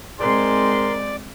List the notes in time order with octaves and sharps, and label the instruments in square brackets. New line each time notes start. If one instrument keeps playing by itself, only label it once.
[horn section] G#2 A#4 C6 [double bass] G#3 C4 [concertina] D5